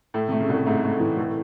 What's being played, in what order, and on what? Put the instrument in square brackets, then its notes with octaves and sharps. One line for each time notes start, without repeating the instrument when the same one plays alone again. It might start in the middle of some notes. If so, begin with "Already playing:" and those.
[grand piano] A2 [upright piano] A3
[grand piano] C3 [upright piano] A3
[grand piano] C#3
[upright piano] C2 [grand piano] A2
[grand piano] G#2 [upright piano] A3
[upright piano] A3
E3
[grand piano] A2 [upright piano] E3